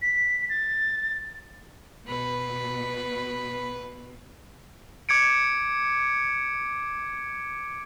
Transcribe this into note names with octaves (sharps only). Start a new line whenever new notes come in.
B6
A6
B2 B4 B5
D6 G#6 C#7 D7